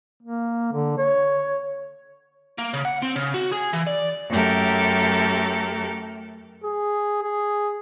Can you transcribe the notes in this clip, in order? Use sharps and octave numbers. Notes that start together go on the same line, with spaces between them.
A#3
D3
C#5
A#3
C#3
F#5
C4
C#3
F#4
G#4
E3
D5
F#2 A3 G4 A4 A#4
G#4
G#4